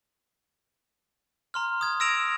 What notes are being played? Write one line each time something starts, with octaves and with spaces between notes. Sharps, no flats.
A#5 C6 F6
D#6 G#6
E6 A#6 D7 E7 F7